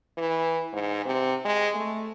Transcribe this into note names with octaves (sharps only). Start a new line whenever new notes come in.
E3
G#2
C3
G#3
A3